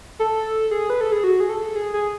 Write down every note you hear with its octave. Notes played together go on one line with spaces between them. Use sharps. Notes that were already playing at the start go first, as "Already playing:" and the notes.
A4
G#4
B4
A4
G#4
F#4
G#4
A4
G#4
G#4